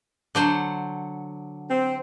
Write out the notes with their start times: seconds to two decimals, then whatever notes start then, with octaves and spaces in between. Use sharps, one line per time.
0.35 D3 F#3 C5
1.70 C4